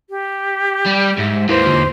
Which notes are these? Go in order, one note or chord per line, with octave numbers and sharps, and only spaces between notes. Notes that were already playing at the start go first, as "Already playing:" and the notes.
G4
G3
G#2 E5
D#2 A#3 E4 B4 C5
E2 D3 F4